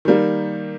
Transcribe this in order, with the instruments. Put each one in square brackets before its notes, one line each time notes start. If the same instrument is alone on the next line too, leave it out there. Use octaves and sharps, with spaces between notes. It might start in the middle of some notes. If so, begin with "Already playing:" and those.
[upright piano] D#3 G3 A#3